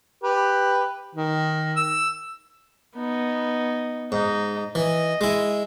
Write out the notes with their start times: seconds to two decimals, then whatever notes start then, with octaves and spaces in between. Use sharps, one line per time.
0.24 G4 B4
1.15 D#3
1.76 E6
2.96 B3 D#4
4.12 G#2 D#4
4.75 E3 D#5
5.21 G#3 E4